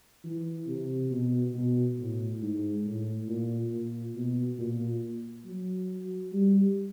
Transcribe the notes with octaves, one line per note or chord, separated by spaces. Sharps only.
E3
C3
B2
B2
A2
G#2
A2
A#2
A#2
B2
A#2
F#3
G3